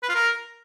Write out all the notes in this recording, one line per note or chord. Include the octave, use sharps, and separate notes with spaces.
B4
F4
A#4